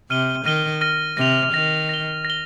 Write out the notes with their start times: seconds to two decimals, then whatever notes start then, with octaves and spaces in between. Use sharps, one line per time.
0.10 C3 F6 D#7 G7
0.45 D#3 F6 A#6 D#7 G7
0.81 F6 A#6 D#7 G7
1.17 C3 A#6 F7
1.53 D#3 A#6 F7
1.89 A#6 G7
2.25 A#6
2.30 G7